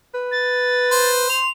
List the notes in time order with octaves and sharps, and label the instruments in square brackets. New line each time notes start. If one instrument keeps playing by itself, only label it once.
[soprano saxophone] B4
[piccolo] A6
[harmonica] C5
[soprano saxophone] C6 [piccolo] F7